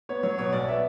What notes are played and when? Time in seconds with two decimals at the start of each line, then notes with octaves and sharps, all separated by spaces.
0.09 B3 C#5
0.23 F#3 C#5
0.38 B2 C#5
0.53 B1 D5
0.68 B3 E5